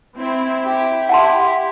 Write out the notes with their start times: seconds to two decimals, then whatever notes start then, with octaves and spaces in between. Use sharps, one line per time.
0.17 C4 E4
0.63 E4 G4
1.09 E4 G4 F#5 A5 C6